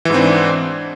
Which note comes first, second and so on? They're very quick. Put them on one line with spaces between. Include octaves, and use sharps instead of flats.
E3 G#2 C4 D4